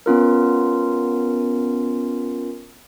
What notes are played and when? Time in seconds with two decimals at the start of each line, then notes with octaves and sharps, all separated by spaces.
0.06 B3 C#4 F4 A#4